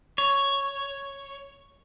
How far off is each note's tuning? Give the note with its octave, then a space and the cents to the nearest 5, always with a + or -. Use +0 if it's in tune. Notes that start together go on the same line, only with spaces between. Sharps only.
C#5 +0